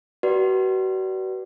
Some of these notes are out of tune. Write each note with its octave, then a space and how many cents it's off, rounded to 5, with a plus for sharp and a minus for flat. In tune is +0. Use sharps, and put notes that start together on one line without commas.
F#4 +40 B4 -20 D5 +0